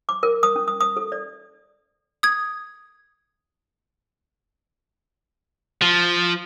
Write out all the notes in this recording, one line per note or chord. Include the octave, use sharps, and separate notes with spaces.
D6
A#4
D#6
C#4
D#6
D#6
A4
D5
D#6 G#6
F3